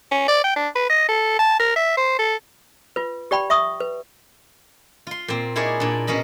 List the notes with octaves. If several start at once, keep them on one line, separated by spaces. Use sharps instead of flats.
C#4
D5
G5
D4
B4
D#5
A4
A5
A#4
E5
C5
A4
F4 B4
G4 D5 G5 B5
E5 C#6 D#6
B4
F4 C6
A#2 C4
D#4 E4 G#4 A#4 C#5 D5
A#2 D4
B2 C#4 A#4 D#5 B5